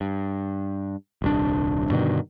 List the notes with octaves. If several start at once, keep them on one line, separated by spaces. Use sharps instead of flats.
G2
D#1 C2 D4
G2 B2 D3 D#3